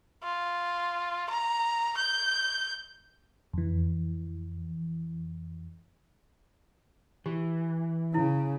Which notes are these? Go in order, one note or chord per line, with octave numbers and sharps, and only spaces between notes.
F4
A#5
G6
F2 E3
E3 G4
C#3 E4